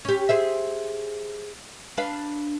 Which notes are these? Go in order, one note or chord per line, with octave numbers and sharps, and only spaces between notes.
C#4 G4
G#4 C5 E5
D4 B4 F5